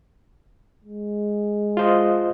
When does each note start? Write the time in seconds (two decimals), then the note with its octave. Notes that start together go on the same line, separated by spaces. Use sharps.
0.84 G#3
1.77 F4 C5 D#5